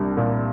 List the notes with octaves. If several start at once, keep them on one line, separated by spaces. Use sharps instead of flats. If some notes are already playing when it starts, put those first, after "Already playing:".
Already playing: C2 G3 D4
A#2